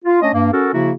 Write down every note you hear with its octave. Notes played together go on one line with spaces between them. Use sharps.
F4
A3 C#4 D4 C#5 D#5
G2 A#3
C#4 F#4 A4 A#4
C#3 F3 A#3 E4 F#4